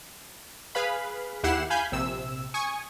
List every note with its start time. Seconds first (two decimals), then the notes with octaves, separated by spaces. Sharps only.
0.75 G#4 B4 F5 B5
1.43 D#2 E4 G4 F#5 C7 E7
1.70 F5 G#5 B5 G6
1.92 A#1 C3 E6
2.54 G#5 C#6 D#6